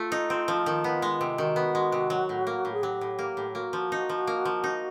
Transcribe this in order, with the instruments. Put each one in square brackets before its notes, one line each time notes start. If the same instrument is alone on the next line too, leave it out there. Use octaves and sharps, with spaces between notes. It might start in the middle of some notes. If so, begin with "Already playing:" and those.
Already playing: [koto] A3 [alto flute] F4
[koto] D#4
C4
F3
D#3
B3
G#3
C3
[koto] D#3 [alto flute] F#4
[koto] B3
G#3
C3
F#3
A2
A#3
A2
[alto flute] G#4
[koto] F#3 [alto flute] G4
[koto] A2
A#3
A2
[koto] A#3 [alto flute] F#4
[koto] F3
D#4
F3
A#3
F3
D#4